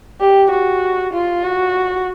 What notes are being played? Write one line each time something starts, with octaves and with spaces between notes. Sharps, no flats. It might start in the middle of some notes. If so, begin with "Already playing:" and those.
G4
F#4
F4
F#4